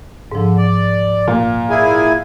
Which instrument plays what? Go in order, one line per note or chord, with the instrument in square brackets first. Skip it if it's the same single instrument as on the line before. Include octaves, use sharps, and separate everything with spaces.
[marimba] G#2 F3 [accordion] D3
[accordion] D5
[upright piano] A#2
[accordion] E4 G#4 G#5